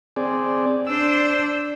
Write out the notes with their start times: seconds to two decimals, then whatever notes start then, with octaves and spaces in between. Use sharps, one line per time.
0.16 C4 G#4 D5
0.87 D4 C5 E6